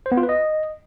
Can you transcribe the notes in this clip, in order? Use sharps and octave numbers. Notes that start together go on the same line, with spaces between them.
C5
B3
F4
B4
D#5